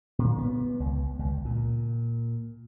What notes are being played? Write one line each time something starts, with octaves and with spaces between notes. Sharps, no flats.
A#2
B3
C#2
C#2
A#2